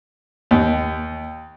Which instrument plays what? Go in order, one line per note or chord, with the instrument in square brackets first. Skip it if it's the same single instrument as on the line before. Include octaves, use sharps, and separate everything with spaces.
[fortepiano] D#2